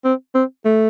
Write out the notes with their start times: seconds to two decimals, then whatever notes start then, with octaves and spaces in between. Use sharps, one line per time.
0.04 C4
0.35 C4
0.65 A3